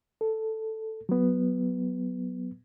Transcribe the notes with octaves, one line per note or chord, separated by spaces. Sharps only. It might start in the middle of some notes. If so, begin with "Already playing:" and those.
A4
F#3 B3